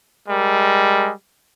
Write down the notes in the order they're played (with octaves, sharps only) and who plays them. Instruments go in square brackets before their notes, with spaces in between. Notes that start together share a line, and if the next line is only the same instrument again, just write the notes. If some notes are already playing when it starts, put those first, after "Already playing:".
[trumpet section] G3 G#3 A#4